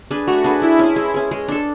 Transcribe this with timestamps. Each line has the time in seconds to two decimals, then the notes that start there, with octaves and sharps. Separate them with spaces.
0.11 D4 G#4 B4
0.27 A3 F#4
0.44 D4 G#4 B4
0.62 G#3 E4
0.79 C#4 G#4
0.96 G#3
1.14 C#4 G#4
1.31 G#3
1.48 D4 A4